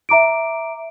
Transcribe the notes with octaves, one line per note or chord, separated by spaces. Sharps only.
E5 A#5 D6 D7